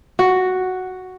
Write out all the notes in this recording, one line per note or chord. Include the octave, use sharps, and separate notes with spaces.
F#4